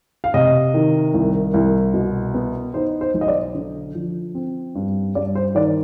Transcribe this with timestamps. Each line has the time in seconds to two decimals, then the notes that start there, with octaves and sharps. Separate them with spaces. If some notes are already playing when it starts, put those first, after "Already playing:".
0.24 F5
0.34 C3 D#5
0.74 D#3
1.14 C2
1.54 C2
1.94 B2
2.34 B3
2.74 D#4 C5
3.01 C5
3.14 B1
3.21 D#5
3.28 D5
3.55 D3
3.95 F3
4.35 C4
4.75 G2
5.15 G2 D5
5.35 C5
5.55 D#3 D5